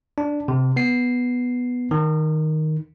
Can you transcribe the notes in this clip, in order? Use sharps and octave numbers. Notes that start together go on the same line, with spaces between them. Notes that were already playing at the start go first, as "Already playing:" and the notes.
D4
C3
B3 C7
D#3